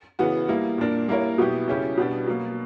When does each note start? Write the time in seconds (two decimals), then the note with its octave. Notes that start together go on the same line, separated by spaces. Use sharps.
0.19 C#3 E3 B3 F#4
0.48 G3 A#3 E4
0.78 A#2 A#3 D4 A#4
1.08 G3 A#3 E4 A#4 C#5
1.38 B2 F#3 B3 E4 G4
1.68 C#3 G3 C#4 E4 G4
1.98 B2 G3 B3 D4
2.27 B2 F#3 A#3